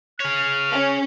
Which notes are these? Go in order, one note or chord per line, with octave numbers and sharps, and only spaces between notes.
G#4 C#5 F6
C#4